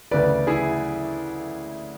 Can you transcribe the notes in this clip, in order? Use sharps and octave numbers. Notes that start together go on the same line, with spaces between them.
D2 C#3 E3 B4 D5
E4 G#4